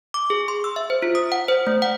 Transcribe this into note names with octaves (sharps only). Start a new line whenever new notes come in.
D6
G#4
C6
E6
E5
C5
F4
D#6
F#5
C5
A3
F#5